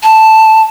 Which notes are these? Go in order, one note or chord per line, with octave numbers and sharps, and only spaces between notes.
A5